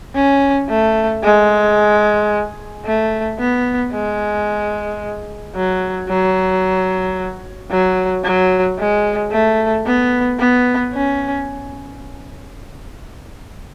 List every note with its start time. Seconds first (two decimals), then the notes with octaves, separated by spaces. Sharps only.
0.15 C#4
0.69 A3
1.23 G#3
2.85 A3
3.39 B3
3.92 G#3
5.55 F#3
6.09 F#3
7.71 F#3
8.24 F#3
8.78 G#3
9.31 A3
9.86 B3
10.39 B3
10.94 C#4